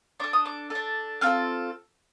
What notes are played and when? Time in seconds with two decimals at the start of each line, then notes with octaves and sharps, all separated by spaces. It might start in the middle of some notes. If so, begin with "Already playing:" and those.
0.20 D4 A4 D6
0.33 D#6
0.46 D6
0.70 D4 A4
1.21 C4 F4 A4 F6